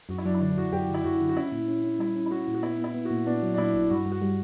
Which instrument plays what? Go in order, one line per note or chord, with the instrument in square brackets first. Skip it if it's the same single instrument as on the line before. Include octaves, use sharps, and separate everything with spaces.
[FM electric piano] F#2 [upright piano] F#4
[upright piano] E4
[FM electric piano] F#3 [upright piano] D4
[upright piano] E4
[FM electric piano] D3 [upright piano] D4
[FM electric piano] F#2 [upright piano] F#4
[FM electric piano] F#2 [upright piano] G4
[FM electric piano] D3
[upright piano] E4
[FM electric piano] F#2 [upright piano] F#4
[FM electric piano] D3
[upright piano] F#4
[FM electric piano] C#4 [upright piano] E4
[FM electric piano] A#2
C#4
C#4
[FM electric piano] G3 [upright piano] E4
[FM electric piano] C#4
[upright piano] E4
[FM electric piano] C#4 [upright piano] F#4
[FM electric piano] A#2
[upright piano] F#4
[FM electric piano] B3 [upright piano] E4
[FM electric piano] B3
[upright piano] E4
[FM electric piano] B3
[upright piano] F#4
[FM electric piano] A#2
[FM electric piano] B3 [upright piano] D4
[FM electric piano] F#3
[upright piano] D4
[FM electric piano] A#2 [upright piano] E4
[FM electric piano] A#1
[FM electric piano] G2 [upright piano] F#4
[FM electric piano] G2
[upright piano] F#4
[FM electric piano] G3